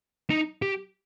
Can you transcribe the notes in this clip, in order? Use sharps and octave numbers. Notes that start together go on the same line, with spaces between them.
D#4
G4